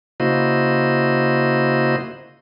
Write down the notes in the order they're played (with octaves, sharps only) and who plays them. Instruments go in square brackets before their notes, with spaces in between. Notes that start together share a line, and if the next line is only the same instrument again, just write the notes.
[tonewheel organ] C#3 A#3 E4 F#4 C5 D#5